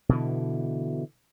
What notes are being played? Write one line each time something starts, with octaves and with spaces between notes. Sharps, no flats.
B2 D3 E3